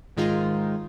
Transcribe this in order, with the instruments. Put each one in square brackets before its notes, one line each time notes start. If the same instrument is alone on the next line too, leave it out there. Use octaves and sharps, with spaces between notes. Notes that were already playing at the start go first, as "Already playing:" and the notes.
[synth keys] G#2 D#3 G#3 D#4 F4